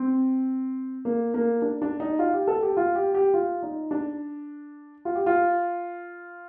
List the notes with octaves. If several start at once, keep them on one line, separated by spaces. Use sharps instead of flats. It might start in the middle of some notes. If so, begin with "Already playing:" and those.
Already playing: C4
A#3
A#3
D4
D4
D#4
F4
G4
A4
G4
F4
G4
G4
F4
D#4
D4
F4
G4
F4